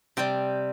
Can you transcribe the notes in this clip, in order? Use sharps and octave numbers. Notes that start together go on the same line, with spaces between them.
C3 G3 G5